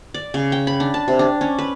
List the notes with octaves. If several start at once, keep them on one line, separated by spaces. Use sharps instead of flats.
D5
C#3
G5
B5
D4
A5
C3
D4
C#4
B4